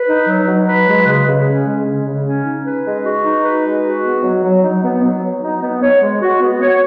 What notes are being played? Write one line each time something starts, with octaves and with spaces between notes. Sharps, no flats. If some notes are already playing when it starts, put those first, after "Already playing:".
Already playing: B4
D#4
F#3
F#3
B4
G#3
C#3
C#3
C#4
G#3
C#3
C#3
C#4
D#4
B4
G#3
F#4
D#4
B4
G#3
F#4
B3
F#3
F#3
D#4
B3
F#3
F#3
D#4
B3
C#5
G#3
F#4
B3
C#5